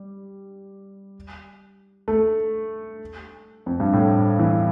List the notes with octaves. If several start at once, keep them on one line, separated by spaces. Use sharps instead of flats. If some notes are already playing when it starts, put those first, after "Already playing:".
Already playing: G3
A3
F2
G2
A2
E3